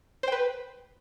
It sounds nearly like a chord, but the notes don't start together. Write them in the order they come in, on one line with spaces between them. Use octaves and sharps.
C5 G5 B4